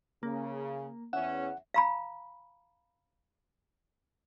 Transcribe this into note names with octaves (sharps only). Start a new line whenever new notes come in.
C#3 A#3
E2 C#4 E5 F#5
F5 A#5 B5